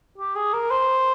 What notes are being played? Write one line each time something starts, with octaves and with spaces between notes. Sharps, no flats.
G4
G#4
A#4
C5